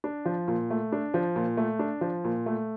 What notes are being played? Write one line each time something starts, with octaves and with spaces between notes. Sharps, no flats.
D4
F3
A#2
A3
D4
F3
A#2
A3
D4
F3
A#2
A3